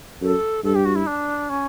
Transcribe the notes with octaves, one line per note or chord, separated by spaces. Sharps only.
F#2 A4
G2 A4
G4
F#4
E4
D4
C#4